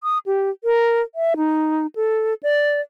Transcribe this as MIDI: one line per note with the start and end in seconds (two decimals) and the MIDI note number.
0.03 0.18 87
0.26 0.50 67
0.64 1.02 70
1.15 1.34 76
1.37 1.87 63
1.95 2.34 69
2.43 2.81 74